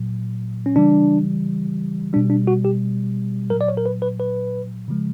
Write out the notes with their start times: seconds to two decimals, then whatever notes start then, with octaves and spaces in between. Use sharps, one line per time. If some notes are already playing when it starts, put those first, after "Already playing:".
Already playing: A#2 F#3
0.66 C#4
0.76 C#3 E3 G3 D4
2.13 B2 G3 D4
2.30 D4
2.47 F#4
2.65 G4
3.50 A#2 F#3 A#4
3.61 D5
3.68 C#5
3.77 A#4
3.86 B4
4.02 B4
4.20 B4
4.88 C#3 F3 G#3